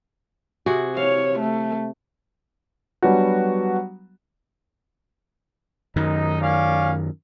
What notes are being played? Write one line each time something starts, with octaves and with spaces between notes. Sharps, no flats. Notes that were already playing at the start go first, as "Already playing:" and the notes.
C3 F#4 G#4
C#5 F5
A3
F#3 G3 B3 D4 F#4
F#2 D#3 D#4
C#4 D5 F5